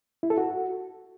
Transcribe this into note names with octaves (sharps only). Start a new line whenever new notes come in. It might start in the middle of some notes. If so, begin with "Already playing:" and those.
E4
A4
F#4